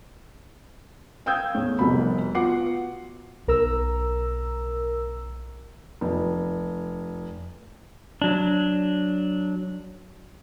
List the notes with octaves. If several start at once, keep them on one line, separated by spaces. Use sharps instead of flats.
F5 G5 D#6 E6 G6 G#6
E2 A2
F1 C2 B2 B5
B3 F4 F#4 F#5 D6 C7
B1 A#4 A#5 E6
F1
F#3 D4